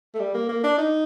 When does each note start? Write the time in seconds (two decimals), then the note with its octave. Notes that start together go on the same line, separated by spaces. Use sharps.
0.15 A3
0.20 G3
0.35 A#3
0.49 A#3
0.64 D4
0.78 D#4